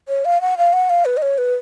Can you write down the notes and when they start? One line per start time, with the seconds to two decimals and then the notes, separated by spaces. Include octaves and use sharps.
0.08 C#5
0.25 F5
0.41 F#5
0.58 F5
0.73 F#5
0.89 F5
1.05 B4
1.17 D#5
1.22 C#5
1.38 B4